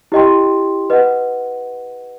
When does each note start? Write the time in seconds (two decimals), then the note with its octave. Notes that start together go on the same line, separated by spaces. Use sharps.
0.12 E4 G4 D#5 G5 C6
0.90 B4 D#5 F#5